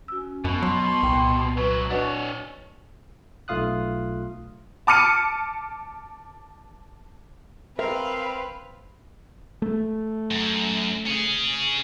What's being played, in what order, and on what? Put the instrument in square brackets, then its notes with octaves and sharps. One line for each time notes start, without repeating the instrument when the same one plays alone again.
[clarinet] C#4 [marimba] F#4 E6
[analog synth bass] F#2 [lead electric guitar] B2
[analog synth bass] F#3 [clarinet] C6
[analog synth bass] C2 [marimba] A#2 G5
[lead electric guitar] B1 F#3 [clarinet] B4
[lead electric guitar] D4 C#5 [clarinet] F#4 [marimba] B4 D#5 F#5
[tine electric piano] B1 A3 F4 F5 D#6 F#6
[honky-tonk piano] A5 D6 F6 C#7 D#7
[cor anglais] C4 [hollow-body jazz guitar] A#4 E5 [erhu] B4 [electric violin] F5
[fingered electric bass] A3
[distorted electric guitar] F#2
C#4 G#4